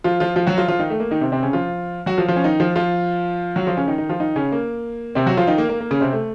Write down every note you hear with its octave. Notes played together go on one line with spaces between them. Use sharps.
F3 F4
F3 F4
F3 F4
F#3 F#4
F3 F4
F3 F4
D#3 D#4
A3
A#3
D#3 D#4
C3 C4
C3 C4
C#3 C#4
F3 F4
F#3 F#4
F3 F4
F3 F4
C#4
D#3 D#4
F3 F4
F3 F4
F#3 F#4
F3 F4
C#3 C#4
D#3 D#4
D#3 D#4
F3 F4
D#3 D#4
C#3 C#4
A#3
C3 C4
F#3 F#4
F3 F4
D#3 D#4
A#3
A#3
A#3
C#3 C#4
C3 C4
A3